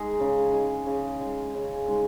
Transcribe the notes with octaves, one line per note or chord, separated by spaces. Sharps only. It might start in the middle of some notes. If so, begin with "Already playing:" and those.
Already playing: G#3 D#4 G#4
C#3
G#3 D#4 G#4
C#3
G#3 D#4 G#4
C#3
G#3 D#4 G#4